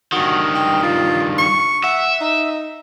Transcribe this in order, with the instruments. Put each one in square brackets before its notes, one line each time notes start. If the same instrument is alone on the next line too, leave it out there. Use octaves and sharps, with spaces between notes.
[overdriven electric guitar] G2 D#3 [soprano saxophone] F#4
[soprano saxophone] G5
F4
C#6
[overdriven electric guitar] E5 [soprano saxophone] F#5
[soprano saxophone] D#4